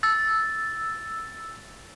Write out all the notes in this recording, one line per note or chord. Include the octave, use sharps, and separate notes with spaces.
E6 A6